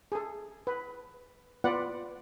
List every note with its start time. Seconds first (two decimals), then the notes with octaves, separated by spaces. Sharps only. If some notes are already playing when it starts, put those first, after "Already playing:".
0.12 G#4 A4
0.67 B4
1.64 B3 F4 B4 D5 F#5